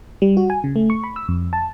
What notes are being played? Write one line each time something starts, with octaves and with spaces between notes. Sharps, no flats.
G3
F#4
G#5
C#3
A3
C#6
B5
E6
F2
A5